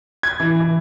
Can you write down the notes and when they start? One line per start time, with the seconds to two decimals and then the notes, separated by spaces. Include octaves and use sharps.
0.23 G#6
0.40 E3
0.60 E3